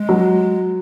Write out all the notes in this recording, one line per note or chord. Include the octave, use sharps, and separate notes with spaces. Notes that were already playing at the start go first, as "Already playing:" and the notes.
Already playing: G#3
F#3